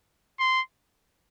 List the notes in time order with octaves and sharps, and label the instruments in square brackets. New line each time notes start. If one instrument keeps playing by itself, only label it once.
[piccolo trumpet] C6